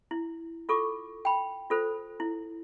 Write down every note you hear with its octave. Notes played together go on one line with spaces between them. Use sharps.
E4
F4 A4 C#6 D6
G5 B5
F4 A4 C5
E4